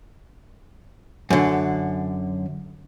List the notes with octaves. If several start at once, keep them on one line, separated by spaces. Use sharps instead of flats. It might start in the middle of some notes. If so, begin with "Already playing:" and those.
F#2 D3